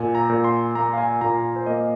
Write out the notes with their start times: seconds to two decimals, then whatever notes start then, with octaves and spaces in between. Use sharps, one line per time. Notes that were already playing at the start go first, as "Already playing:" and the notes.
Already playing: A#2 G#5
0.15 A#5
0.30 A#2
0.44 C6
0.75 A#3 A#5
0.93 F5
0.98 G#5
1.21 A#2 A#5
1.56 C5
1.66 A#3 D#5